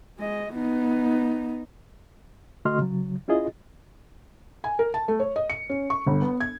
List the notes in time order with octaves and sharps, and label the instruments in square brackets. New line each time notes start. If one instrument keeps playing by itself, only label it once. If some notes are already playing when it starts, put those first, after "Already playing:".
[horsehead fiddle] G#3 D#5
B3 D#4
[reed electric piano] D3 A3 F#4 D#5 C6 F6
C#3 F#3
C#4 E4 F4 G#4 D#5
[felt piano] G#5
A#4
A5
A3
C#5
D#5
C#7
C#4
C#6
G1
B3
G#6